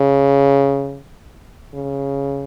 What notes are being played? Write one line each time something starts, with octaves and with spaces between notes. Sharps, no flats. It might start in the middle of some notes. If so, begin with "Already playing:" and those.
Already playing: C#3
C#3